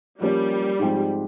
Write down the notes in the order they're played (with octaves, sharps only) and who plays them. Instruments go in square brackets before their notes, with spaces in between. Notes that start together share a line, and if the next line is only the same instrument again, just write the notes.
[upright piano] F3 A#3 C#4 [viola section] G3
[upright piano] G#2 F3 G#3 C4 G4